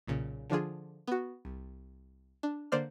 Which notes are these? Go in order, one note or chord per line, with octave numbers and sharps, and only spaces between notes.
B1 A#2 C#3
D3 F3 D4 F4 G#4
B3 F#4
C2
D4
D3 A#3 C5 D5 F6